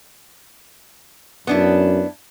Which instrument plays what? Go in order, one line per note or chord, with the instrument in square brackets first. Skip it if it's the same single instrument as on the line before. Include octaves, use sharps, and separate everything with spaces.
[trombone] F#2 [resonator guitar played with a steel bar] B3 D4 E4